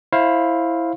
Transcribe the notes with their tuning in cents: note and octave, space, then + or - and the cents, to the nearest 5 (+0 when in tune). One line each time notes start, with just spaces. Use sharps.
E4 +0 C5 +25 F5 +0